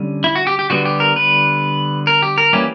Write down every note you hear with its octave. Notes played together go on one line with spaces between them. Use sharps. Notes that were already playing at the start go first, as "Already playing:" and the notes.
Already playing: D3 G3 C#4
E4
F#4
G4
G4
D3 G3 B3 F#4
G4
A#4
B4
A#4
G4
A#4
E3 G3 A#3 C#4 G4